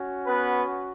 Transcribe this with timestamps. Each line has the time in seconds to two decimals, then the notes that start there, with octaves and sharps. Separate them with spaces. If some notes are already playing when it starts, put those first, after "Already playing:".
Already playing: C#4 F#4
0.26 B3 B4